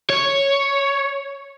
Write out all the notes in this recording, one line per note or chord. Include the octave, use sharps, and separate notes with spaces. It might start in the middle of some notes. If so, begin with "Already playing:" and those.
C#5